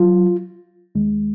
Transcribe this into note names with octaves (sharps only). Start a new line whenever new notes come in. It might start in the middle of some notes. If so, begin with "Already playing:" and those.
Already playing: F#3 F4
D#2 D#3 G#3